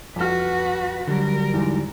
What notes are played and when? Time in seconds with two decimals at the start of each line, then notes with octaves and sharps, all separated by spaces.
0.16 F2 F#4 B4 F6
1.07 D3 F#3 G3 A#4
1.54 E2 G#2